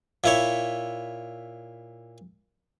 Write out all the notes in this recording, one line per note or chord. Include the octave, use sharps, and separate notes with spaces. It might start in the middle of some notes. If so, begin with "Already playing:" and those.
A#2 E4 C#5